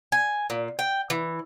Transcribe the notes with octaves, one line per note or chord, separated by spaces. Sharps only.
G#5
A#2
G5
E3